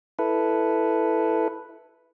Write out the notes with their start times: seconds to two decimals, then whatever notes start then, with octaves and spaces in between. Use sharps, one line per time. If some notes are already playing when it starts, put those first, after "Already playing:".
0.19 E4 A4 B4